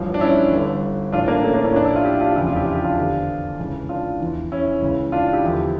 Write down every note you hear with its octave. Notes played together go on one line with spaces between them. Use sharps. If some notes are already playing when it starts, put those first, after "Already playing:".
Already playing: A1 G2 F3
D4
C#4 E4
G1 G2 D3
A1 A2 E3 D4 F4
A#3 D4
A3 C#4
A#3 D4
C#4 E4
A#1 A2 F3 D4
E4
F4
E4 G4
D4 F4
F1 E2 C#3 F3 E4 G4
D4 F4
E4 G4
F4
G4
D4 F4
E2 D3 F3
C#2 C#3 E3
D4 F4
E2 E3
C#4 E4
C#2 C#3 E3
D4 F4
E4 G4
E2 D3 F3